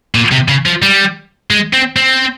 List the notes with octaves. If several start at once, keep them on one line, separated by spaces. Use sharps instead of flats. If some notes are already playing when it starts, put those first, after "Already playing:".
A#2
C3
C#3
F3
G3
G#3
C4
C4